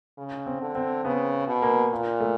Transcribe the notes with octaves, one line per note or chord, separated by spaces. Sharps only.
C#3
C4
D3
C4
C#3 B3
B2
A#3
A#2
A3